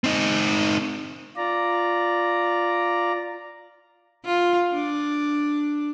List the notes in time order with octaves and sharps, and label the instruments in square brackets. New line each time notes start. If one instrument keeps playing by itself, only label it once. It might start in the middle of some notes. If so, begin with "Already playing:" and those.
[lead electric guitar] C4 D#4
[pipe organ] F4 D5 A#5
[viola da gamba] F4
D4